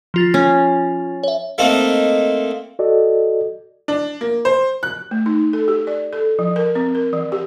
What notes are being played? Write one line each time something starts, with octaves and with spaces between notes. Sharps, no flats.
F3 F4 A6
C#4
C#5 E5
A3 A#3 C4 D#4
F#4 A4 D5 D#5
D4
A#3
C5
F#6
A3
D#4
A4
G4
D5
A4
F3
A#4
C4
A#4
E3
G4